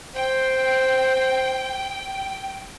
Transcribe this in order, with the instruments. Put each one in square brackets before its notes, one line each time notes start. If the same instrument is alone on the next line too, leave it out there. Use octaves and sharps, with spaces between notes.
[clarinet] C5 [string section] G5